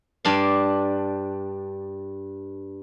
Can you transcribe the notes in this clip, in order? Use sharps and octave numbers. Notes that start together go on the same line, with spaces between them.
G2 D4 D5 F5